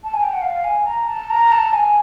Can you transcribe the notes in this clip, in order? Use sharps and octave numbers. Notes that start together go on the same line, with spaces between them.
A5
G#5
G5
F#5
F5
G#5
A#5
A5
A#5
A5
G#5